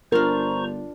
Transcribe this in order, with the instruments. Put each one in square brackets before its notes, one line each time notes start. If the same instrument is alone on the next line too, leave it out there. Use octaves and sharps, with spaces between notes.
[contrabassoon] G1 [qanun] D4 F4 [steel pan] A#4 [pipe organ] C5 A#5 C#6